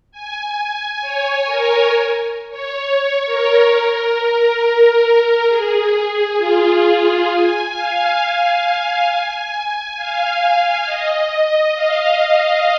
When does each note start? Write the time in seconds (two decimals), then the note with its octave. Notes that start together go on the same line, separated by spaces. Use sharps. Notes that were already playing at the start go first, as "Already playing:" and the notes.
0.12 G#5
1.01 C#5
1.46 A#4
2.50 C#5
2.81 C#5
3.26 A#4
3.70 A#4
5.48 G#4
6.38 F4
6.82 G#4
7.28 G#5
7.72 F5
8.17 G#5
9.96 F5
10.40 F5
10.86 D#5
11.30 D#5
11.75 F5